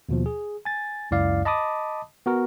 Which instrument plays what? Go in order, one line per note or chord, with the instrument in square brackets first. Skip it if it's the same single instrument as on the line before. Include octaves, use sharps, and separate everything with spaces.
[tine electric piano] D#2 B2 F3
G#4
G#5 A6
C#2 F#2 E4 D5 F5
D#5 A5 B5 D6 D#6
B3 F#4 A#4